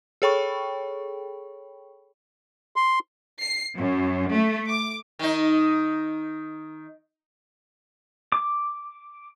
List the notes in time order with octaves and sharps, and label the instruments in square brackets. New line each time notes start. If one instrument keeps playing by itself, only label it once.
[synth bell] G#4 A4 C#5 G5 B5 C#6
[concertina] C6
[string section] C7
F#2
A3
D6
[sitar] D#3 D#4
[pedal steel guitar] D6